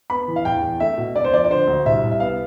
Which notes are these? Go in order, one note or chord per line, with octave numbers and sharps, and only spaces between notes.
B3 B5
E3
F5
E2 G5
E2
A3 E5
B2
E1 D5
C5
F3 D5
D5
D3 C5
D2
C2 E5
C2
E5
B3 F5